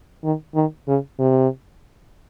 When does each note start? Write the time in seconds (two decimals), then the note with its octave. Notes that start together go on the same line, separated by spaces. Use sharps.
0.24 D#3
0.55 D#3
0.88 C#3
1.19 C3